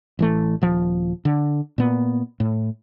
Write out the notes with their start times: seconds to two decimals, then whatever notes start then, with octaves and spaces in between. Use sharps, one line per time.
0.19 A1 E3 A3
0.62 D#1 F3
1.25 D3
1.78 A#2 B3
2.40 A2